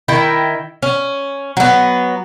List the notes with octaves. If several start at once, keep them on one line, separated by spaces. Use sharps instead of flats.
D#3 E4 E5 G5
C#4
F#3 B3